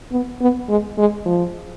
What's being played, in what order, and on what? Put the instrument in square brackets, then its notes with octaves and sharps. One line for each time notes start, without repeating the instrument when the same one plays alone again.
[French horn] B3
B3
G#3
G#3
F3